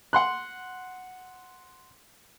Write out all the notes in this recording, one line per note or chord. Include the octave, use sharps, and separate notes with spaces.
F#5 C6 F#6